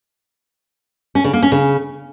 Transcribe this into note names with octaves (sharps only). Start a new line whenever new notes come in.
C#4
C#3
A#3
C#4
C#3